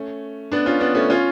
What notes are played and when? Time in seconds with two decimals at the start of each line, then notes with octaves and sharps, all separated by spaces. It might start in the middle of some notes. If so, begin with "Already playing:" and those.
Already playing: A3 C#4
0.52 B3 D4
0.66 C#4 F4
0.80 B3 D4
0.95 A3 C#4
1.10 C#4 F4